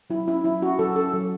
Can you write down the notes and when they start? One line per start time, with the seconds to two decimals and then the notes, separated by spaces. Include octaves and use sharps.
0.10 F#3 E4
0.27 C#4 E4
0.44 F#3 E4
0.62 C#4 F#4
0.79 F#3 A4
0.96 C#4 A4
1.13 F#3